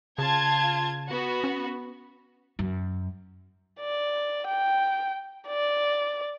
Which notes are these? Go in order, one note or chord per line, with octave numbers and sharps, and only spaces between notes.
C#3 F4 A5 G#6
B3 F#4
C#4
F#2
D5
G5
D5